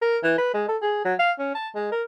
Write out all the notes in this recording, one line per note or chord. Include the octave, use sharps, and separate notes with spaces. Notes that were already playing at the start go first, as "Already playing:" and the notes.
A#4
E3
B4
G#3
A4
G#4
F#3
F5
C#4
A5
G#3
A#4